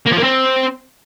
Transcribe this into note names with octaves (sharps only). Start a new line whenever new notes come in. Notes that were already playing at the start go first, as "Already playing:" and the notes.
A#3
F3
A#3
C4